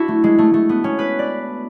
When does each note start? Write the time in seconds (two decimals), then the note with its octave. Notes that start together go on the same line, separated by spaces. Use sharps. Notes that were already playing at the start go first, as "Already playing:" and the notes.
Already playing: D4 E4 F#4
0.08 A3
0.24 G#3
0.38 A3
0.54 A3
0.69 B3
0.84 C#4
0.99 B4
1.19 D5